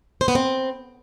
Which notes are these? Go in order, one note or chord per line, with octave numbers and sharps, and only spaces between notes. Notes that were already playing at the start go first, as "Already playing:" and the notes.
C5
B3
C4